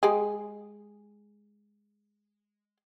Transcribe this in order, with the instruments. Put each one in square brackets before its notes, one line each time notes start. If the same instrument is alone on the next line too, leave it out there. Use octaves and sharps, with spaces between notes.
[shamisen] G#3 G4 G#4